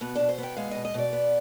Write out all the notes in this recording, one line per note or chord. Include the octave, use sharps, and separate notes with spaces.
B2 B3
B2 D4
C5
B3 G5
G#3 F5
B2 D#5
D#5
B2 D5
B3